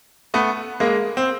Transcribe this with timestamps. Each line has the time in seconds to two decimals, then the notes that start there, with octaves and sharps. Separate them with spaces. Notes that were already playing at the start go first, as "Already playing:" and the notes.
0.34 A3 B3
0.80 G#3 A#3
1.17 C4